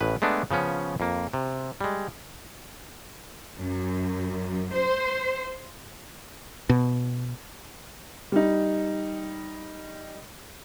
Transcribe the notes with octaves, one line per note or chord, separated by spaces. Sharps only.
A1 A2 B4
G#3 A3 B3 D4
C#3 F3 B3 C#4
F2 A#3
C3
G3 G#3
F#2
C5
B2
G3 D#4